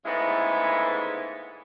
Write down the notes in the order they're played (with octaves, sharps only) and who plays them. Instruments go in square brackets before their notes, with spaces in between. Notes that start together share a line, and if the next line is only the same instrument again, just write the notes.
[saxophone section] D2 G#2 C#3 G#3 B3 E4